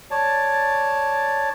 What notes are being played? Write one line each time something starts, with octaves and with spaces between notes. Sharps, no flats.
C#5 D5 A5